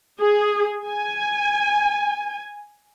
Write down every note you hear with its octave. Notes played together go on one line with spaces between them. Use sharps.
G#4
G#5